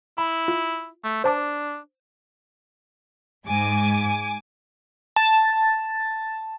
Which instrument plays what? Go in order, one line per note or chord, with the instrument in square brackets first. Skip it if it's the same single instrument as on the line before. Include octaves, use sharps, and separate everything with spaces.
[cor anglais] E4 [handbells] B5
[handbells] F4
[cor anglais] A3
[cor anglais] D4 [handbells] C5 A5 D6
[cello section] G#2 [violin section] G#5 D6
[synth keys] A5